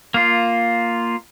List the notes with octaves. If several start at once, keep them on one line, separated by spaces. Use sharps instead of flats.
A#3 F4